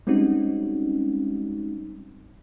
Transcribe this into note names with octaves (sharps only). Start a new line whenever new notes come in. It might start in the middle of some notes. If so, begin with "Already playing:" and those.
G3 G#3 C4 C#4 D#4 F#4